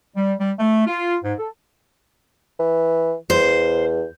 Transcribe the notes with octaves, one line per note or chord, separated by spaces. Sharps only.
G3
G3
A3
F4
G#2
A4
E3
E2 C5